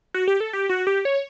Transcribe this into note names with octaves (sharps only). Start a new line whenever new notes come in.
F#4
G4
A4
G4
F#4
G4
C#5